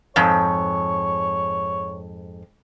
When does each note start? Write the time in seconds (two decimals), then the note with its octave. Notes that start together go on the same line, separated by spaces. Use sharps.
0.16 F2 G#2 C#5